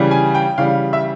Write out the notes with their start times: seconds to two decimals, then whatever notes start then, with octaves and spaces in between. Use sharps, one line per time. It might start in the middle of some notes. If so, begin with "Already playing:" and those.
Already playing: C#3 E3 G3
0.11 G#5
0.35 G5
0.58 C#3 E3 G3 F5
0.93 E5